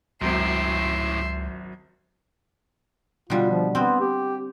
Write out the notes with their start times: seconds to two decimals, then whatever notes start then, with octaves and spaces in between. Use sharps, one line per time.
0.22 G#1 C#2 F#2 A2 G4 E5 C6
3.30 B2 D3 G3 F4
3.50 F3
3.75 B3 C4 F#4
4.01 G4